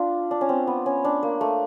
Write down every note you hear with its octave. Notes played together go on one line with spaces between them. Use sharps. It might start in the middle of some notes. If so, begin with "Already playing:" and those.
Already playing: D4 F4
D4
C#4
C4
B3
C#4
D4
A#3
A3